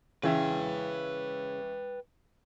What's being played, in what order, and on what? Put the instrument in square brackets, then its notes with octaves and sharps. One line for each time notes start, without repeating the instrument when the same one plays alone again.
[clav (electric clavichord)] C#3 [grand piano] E3 C#4 E5 [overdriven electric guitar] B4 G5